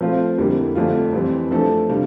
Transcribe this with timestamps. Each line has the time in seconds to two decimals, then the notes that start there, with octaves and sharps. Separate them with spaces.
0.01 F3 A3 C4 F4 C5
0.38 F2 D3 G3 A#3 E4
0.75 F2 D3 A3 D4 F4
1.13 F2 E3 G3 C4
1.51 F3 A3 D4 A4
1.89 C3 G3 D4 F4